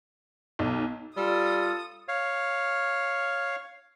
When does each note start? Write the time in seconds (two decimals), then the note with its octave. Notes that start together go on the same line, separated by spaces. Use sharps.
0.59 B1
1.17 G3 F4 A4 D#6
2.08 C#5 F5